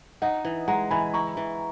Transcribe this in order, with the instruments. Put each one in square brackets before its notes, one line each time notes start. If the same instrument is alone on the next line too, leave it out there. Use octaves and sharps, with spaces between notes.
[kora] D#4 [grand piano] D#5 F#5
[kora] E3
[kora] G#3 [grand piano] F#5 A#5
[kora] E3 [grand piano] G#5 B5
[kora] E4 [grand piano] A#5 C#6
[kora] E3